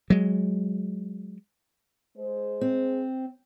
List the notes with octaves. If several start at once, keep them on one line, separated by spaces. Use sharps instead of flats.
F#3 G#3
G#3 C5
C4